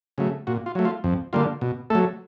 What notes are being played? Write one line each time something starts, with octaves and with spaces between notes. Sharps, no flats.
C#3 F#3 A3
A#2 F#4
F4
F#3 A3
F4
F2
D3 G3 A#3 F4
B2
F#3 A3 A4